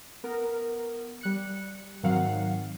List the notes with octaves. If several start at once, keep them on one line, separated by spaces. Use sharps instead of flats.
B3 A#4
G3 F#6 C#7
G#2 D#3 F#3 C4 F5 F#5